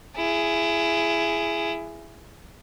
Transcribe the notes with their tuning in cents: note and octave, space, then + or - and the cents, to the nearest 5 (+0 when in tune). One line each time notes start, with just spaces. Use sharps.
E4 +25 G#4 +5